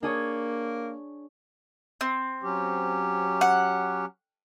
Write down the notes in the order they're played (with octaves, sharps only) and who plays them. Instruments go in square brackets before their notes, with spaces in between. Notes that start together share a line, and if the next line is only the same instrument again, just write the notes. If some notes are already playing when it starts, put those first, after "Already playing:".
[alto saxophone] A#3 [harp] D4 G#4 C#5
[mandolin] C4
[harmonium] F#3 C#4 G4
[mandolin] F#5